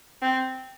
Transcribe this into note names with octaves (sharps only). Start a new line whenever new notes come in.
C4